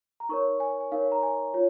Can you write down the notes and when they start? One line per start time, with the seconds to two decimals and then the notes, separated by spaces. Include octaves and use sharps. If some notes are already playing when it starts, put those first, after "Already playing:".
0.20 A#5
0.29 D#4 A#4 C#5 C#6
0.60 G#5
0.81 G#5
0.92 D#4 A#4 C#5 F5
1.12 A#5
1.23 G#5
1.54 F4 C#5